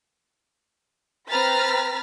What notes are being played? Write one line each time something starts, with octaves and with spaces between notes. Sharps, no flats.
C4 B4 A#5 F6 A6 B6